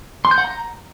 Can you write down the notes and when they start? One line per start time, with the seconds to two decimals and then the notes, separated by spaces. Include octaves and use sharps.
0.25 C6
0.31 G6
0.38 F#5
0.44 A#5